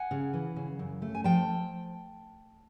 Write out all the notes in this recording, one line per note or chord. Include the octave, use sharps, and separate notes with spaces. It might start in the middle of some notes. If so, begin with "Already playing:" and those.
Already playing: F#5 G#5
C#3
E3
C#3
F#2
A3
G#5
F3 G5 A5
F3